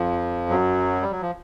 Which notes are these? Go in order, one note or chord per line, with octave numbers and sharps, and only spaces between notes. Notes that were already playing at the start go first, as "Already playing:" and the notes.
Already playing: F2 F3
F#2 F#3
G3
F#3
F3